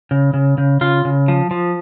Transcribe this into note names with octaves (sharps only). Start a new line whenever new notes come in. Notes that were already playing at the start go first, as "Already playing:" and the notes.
C#3
C#3
C#3
C#3 F4
C#3
F3
F3